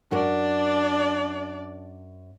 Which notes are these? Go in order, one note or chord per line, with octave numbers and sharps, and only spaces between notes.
F#2 D4 F#4 A#4 D5